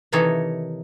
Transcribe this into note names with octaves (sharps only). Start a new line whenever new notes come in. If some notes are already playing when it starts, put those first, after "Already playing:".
C3 D#3 E3 D#4 A4 C#5